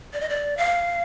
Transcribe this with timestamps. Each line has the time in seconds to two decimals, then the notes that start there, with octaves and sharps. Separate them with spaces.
0.13 D5
0.21 D#5
0.29 D5
0.57 F5